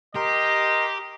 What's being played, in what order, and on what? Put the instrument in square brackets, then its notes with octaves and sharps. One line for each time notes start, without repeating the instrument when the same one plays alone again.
[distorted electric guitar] G4 [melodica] A#4 C6 [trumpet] D#5